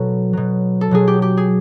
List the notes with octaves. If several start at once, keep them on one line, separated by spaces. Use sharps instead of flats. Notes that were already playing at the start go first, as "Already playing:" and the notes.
Already playing: B2 F#3 A4
B2 F#3
A4
B2 F#3 G#4
G4
G4
G#4